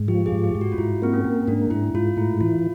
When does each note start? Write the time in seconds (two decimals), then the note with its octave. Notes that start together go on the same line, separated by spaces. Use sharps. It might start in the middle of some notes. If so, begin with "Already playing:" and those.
Already playing: G#2
0.08 F3 G4
0.26 G#4
0.32 G#2
0.44 G4
0.55 G#2
0.61 F#4
0.72 F4
0.78 G#2 E4
1.02 A#3 C4
1.13 C#4
1.25 A#3
1.48 G#2 D4
1.70 G#2 E4
1.94 G#2 F4
2.17 A2 E4
2.41 E3 F4